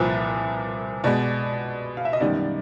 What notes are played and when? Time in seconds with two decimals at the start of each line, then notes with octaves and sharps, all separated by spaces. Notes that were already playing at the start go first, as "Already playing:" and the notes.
Already playing: C2 A#2 F3 B4
1.04 B2 G#3 B3 D5
1.97 F5
2.05 E5
2.13 D#5
2.20 F#2 D#3 G3 B3 D5